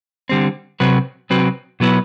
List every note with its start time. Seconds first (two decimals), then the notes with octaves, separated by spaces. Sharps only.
0.29 D3 G3 C4
0.80 C3 F#3 C4 F#4 B4
1.30 C3 F#3 C4 F#4 B4
1.80 B2 F#3 B3 E4 B4